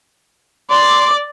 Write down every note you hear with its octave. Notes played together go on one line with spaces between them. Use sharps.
D5 C6 D6